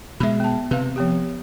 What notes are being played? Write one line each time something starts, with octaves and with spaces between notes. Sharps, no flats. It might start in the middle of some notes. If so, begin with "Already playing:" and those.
B2 G#3 E5 B5
B3 A5
C3 B4 F5
F3 B3 G4